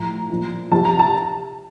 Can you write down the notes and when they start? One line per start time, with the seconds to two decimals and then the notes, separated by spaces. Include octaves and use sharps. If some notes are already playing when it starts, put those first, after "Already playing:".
Already playing: A2 F3 A#5
0.30 A#2 F3
0.72 C3 F3 A5
0.85 A#5
0.99 A5